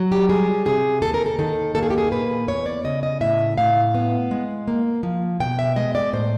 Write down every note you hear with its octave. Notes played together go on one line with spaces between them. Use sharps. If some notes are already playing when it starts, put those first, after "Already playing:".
Already playing: F#3
G4
G3 G#4
C3 G#4
D#2 A4
A#4
A4
D#3 A4
A#3 A4
G#4
G4
G#4
A#2 B4
E2 C#5
D5
C#3 D#5
D#5
A2 E5
A2 F5
B3
G#3
A#3
F3
B2 G5
E5
G#3 D#5
D5
A2 C5